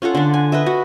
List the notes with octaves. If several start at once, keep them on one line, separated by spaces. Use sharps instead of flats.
C#4 F4 A4 F#5
D3 D4
G#5
B4 D#5 E5
F#4